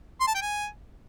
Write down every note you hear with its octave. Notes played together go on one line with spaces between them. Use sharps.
C6
A5
G5
G#5